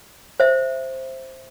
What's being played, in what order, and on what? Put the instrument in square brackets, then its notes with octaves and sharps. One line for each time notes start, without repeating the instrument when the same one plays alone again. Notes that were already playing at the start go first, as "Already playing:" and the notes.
[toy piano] C5 E5